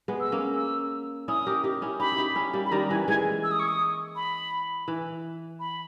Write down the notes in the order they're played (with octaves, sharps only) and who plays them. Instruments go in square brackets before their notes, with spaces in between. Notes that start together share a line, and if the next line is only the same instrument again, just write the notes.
[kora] G#3 B3
[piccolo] E6
[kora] A#3 C#4
[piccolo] E6
[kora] C#4 E4 [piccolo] D#6
[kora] G4 A#4
D#4 G4
C#4 E4
[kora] D#4 G4 [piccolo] B5
[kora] E4
D#4 G4
C#4 E4
G3 A#3
[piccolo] B5
[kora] D#3 G3 [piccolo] A#5
[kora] E3 [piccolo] G#5
[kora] E3 G#3 [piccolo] G#5
[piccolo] E6
D#6
C#6
D#6
B5
[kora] E3
[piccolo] B5